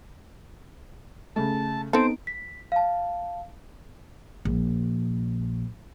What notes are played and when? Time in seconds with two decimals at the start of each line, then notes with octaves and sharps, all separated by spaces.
1.36 C#3 A3 A5
1.93 B3 C4 D#4 A4 C5 D7
2.27 B6
2.72 F5 A5
4.45 A#1